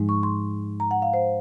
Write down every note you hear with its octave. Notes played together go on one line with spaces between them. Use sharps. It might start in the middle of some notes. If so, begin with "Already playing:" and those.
Already playing: G#2 F3 G#3 D#4
C#6
C6
A#5
F#5
F5
C5